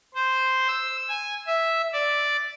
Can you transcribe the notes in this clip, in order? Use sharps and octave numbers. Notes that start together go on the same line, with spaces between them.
C5
E6
G#5
E5
D5